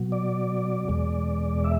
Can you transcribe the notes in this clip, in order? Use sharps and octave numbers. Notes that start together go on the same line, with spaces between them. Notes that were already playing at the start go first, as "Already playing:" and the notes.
Already playing: B2 F#3
D5
E2 B2 G#3
E5